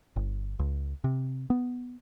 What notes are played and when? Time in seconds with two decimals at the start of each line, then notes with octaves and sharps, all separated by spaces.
0.16 G1
0.59 C#2
1.04 C3
1.50 B3